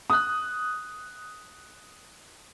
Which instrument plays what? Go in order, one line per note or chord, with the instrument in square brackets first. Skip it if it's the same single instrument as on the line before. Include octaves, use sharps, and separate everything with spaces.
[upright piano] D#6 F#6